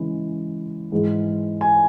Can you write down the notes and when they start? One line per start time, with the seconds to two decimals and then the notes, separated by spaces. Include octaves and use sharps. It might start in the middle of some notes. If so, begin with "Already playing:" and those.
Already playing: C#3 E3 G#3
0.92 G#2 E3 G#3
1.61 G#5